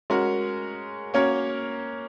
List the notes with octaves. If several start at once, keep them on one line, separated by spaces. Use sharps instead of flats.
G#3 C#4 F#4 A#4
A#3 C#4 F#4 A#4 C#5